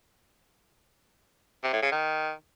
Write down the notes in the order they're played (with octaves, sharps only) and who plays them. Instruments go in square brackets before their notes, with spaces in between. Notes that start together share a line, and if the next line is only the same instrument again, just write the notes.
[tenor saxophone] C3
A2
C#3
D#3